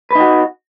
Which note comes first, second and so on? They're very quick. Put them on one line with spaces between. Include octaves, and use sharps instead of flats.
B4 D#4 F#4